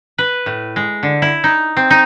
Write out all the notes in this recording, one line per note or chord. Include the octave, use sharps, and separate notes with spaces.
B4
A2
G#3
D3
E4
D#4
C4
D#4